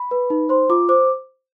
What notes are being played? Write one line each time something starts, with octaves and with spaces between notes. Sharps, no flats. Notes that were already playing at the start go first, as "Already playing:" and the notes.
Already playing: B5
B4
D#4
C5 C6
F4 D6
C5 D6